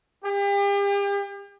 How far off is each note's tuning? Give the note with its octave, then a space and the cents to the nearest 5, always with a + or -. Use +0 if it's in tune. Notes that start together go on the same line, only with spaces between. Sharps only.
G4 +40